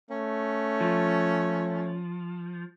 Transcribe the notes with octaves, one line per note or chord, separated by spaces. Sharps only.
A3 C#4
F3